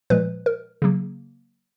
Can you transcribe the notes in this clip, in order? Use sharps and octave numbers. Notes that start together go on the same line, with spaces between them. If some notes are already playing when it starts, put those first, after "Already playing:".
A#2 F3 G#3 B4
A#4
C#3 F#3 A#3